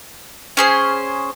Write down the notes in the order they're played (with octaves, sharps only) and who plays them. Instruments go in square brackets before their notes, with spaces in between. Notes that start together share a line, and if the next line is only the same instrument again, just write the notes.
[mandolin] C#4 G#4 C5